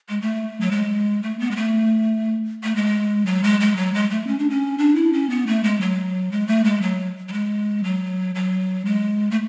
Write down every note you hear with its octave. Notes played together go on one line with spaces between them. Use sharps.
G#3
A3
F#3
G#3
A3
B3
G#3
A3
A3
G#3
F#3
G#3
G#3
F#3
G#3
A3
C#4
D4
C#4
D4
E4
C#4
B3
A3
G#3
F#3
G#3
A3
G#3
F#3
F#3
G#3
F#3
F#3
G#3
A3